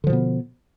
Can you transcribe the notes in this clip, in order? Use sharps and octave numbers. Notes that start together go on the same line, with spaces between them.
B2 D3 F3 B3